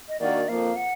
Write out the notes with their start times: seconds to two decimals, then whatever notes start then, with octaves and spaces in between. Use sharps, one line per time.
0.09 D#5
0.20 D#3 A#3 D4 F#4 D5
0.48 F2 F3 A#3 F5
0.76 F#5